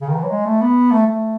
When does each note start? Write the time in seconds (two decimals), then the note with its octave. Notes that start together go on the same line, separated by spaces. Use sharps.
0.01 C#3
0.09 D#3
0.16 E3
0.24 F#3
0.31 G#3
0.46 A3
0.61 B3
0.91 A3
1.07 A3